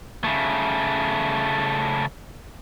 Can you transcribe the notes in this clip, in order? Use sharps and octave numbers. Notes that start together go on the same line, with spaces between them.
C#3 A3